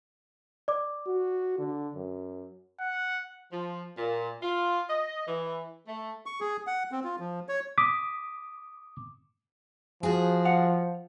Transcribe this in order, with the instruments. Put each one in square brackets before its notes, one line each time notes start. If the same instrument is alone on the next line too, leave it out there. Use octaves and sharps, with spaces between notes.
[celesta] D5 D6
[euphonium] F#4
D3
F#2
[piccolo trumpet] F#5
[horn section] F3
A#2
F4
D#5
E3
A3
[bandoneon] C#6
G#4
F#5
C4
F4
F3
C#5
[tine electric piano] D6 D#6 B6
[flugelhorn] F3 [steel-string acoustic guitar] F#4 G#4
[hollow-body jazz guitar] F5 F#5